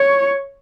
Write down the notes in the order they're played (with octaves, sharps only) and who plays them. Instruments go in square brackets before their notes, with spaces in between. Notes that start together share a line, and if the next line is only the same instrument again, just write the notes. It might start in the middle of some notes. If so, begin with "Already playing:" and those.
Already playing: [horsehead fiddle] C#5